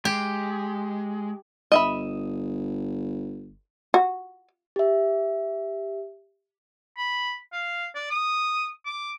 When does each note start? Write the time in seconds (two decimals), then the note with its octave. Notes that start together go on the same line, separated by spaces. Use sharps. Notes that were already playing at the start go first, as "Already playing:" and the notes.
0.05 G#3 G4
1.72 G1 D#5 E5 B5
3.94 F#4
4.76 G4 E5
6.97 B5
7.53 F5
7.95 D5
8.11 D#6
8.86 D6